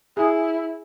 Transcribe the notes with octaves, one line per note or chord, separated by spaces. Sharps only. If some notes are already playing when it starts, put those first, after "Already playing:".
E4 G#4